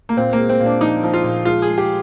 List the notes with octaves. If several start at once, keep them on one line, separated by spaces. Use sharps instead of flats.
A#3
A#2 C4
A#3
G#3
C4
A#2
D4
F3 D#4
F3
F4
A#2
G#3 F4
G#4
G#3
G4